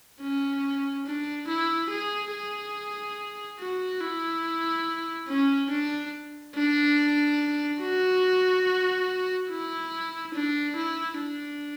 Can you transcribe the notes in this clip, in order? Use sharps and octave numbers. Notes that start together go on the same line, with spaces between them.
C#4
D4
E4
G#4
G#4
F#4
E4
C#4
D4
D4
F#4
E4
D4
E4
D4